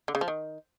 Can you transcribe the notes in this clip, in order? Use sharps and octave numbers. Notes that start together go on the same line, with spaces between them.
D3
C#3
F3
D#3